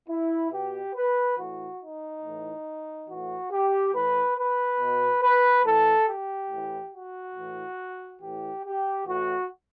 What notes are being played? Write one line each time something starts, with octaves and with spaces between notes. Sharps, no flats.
E4
B2 G4
B4
A2 E3 F#4
D#4
A2 E3
A2 E3 F#4
G4
A2 E3 B4
B4
B2
B4
A2 E3 A4
G4
A2 E3
F#4
A2 E3
A2 E3 G4
G4
A2 E3 F#4